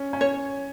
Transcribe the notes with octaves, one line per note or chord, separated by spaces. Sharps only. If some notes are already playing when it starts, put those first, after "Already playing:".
Already playing: C#4
C#4
C#5